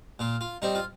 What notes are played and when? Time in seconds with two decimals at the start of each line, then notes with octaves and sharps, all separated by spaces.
0.19 A#2 F4
0.41 F4
0.62 G3 C4 D#4
0.75 F4